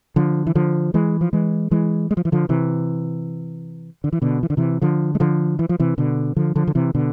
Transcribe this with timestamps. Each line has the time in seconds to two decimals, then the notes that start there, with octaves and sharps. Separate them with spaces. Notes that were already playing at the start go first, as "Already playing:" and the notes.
0.16 D3 F3
0.47 E3
0.55 D3 F3
0.94 E3 G#3
1.21 F3
1.33 E3 G#3
1.71 E3 G#3
2.11 G#3
2.17 F3
2.25 E3
2.32 D3 F3
2.49 C3 E3
4.04 D3
4.13 E3
4.22 B2 D3
4.43 E3
4.50 D3
4.57 C3 E3
4.82 D3 F3
5.15 G#3
5.20 D3 F3
5.59 E3
5.69 F3
5.80 C3 E3
5.98 B2 D3
6.36 D3 F3
6.56 D3 F3
6.67 D3
6.75 C3 E3
6.95 B2 D3